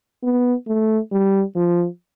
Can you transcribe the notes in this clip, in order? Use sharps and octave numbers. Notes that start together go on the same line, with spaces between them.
B3
A3
G3
F3